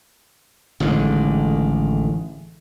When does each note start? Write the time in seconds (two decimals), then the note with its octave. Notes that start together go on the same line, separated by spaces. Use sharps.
0.80 A1 D3 D#3 G#3